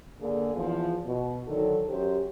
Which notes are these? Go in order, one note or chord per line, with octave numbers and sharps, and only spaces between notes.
D3 A#3 G#4
E2 F3
B2
D3 D#3 F#3 A4
F#2 G4 C5